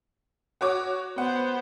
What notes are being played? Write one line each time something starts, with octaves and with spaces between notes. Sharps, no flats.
F#4 C#5 D6
B3 C5 F#5